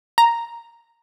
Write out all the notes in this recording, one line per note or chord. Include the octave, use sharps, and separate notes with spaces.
A#5